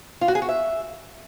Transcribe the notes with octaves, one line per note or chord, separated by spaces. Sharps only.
F4
F#4
G#4
F#4
E5